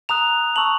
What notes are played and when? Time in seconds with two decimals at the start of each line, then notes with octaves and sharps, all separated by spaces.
0.09 A#5 D#6 F#6 F7
0.56 A5 C#6 E6 F#7